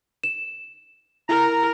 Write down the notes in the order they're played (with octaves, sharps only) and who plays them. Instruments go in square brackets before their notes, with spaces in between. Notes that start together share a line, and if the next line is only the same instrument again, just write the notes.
[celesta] E7
[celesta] E4 [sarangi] A#4 [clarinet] A#5